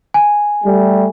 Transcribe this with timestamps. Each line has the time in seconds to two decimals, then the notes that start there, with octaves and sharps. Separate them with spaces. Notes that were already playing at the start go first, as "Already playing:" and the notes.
0.14 G#5
0.65 G3 A3